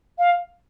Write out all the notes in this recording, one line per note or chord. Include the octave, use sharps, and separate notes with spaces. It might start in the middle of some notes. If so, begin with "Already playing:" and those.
F5